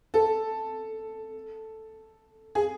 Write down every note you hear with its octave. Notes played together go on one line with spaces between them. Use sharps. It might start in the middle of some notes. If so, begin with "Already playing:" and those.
A4
G#4